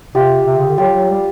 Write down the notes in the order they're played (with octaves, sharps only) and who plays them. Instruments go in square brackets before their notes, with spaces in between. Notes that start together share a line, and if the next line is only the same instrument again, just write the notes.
[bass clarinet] C3 [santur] F4 G4
[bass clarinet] C3
C#3
D3
[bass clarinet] F#3 [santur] F4 G4
[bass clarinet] F#3
G3